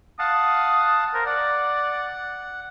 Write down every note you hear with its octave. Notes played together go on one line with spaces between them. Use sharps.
F5 F#5 A5 D#6
A#4 C5
D5 F#5